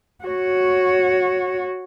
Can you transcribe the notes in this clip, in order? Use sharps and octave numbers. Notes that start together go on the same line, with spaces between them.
F#4 C#5